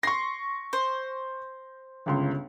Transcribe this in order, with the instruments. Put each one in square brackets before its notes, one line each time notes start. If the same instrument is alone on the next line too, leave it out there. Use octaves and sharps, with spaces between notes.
[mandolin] C6 [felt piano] C#6 A#6
[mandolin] C5
[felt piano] G1 C#2 C6